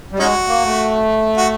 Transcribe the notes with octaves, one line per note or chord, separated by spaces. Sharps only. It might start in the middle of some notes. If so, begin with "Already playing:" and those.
G3
G#3 C#4 D#4 F#4
A#3
A3
F#4